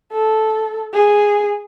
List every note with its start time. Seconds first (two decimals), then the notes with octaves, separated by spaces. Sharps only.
0.12 A4
0.93 G#4